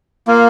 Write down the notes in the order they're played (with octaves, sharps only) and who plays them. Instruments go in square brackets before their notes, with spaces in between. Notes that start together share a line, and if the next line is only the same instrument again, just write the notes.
[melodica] A#3 [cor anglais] F4